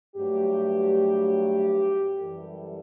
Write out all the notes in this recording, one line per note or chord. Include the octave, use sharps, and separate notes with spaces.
G2 F#3 A3 G4
F#2 E3 G3 A4